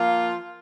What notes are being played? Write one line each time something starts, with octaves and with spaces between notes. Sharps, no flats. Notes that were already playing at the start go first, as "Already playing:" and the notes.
Already playing: F3 A#3 F4